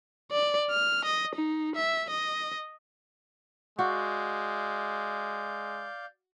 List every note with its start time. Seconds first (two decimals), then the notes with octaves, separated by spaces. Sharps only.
0.32 D5
0.70 F6
1.05 D#5
1.35 D#4
1.75 E5
2.10 D#5
3.79 G#3 F#4 D5 F5 G6